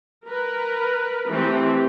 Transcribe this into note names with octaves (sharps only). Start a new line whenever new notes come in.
A#4 B4
E3 A3 C4 G4